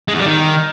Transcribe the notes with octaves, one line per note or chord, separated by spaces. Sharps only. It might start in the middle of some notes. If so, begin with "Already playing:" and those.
G#3
E2
G3
D#3